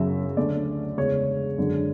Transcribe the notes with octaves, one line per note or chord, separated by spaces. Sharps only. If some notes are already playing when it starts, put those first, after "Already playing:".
Already playing: F#2 C#3 F#3 C#4 E5
D2 D3 A3 D5
E2 C#3 G#3 C#5
F#2 D3 G#3 D4